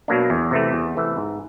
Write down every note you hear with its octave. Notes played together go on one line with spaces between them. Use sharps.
B2 F#3 A#3 D4
E2
C3 E3 A3
E2
C3 E3 A3
G#2